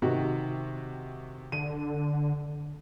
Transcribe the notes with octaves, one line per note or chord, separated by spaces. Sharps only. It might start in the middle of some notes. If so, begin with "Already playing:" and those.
C3 D#3 F#4
D3 D#7